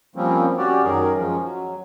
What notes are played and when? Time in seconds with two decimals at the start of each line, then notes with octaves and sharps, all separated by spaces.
0.16 F3 G3 A#3 C4 C#4
0.57 C#4 F#4 G4 D5
0.83 F#2 D#3 F#3 G#4 A#4
1.16 F3 G#3 C#4
1.42 F#3